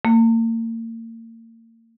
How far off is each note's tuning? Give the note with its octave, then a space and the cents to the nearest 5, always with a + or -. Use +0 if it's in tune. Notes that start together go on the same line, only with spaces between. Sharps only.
A#3 -40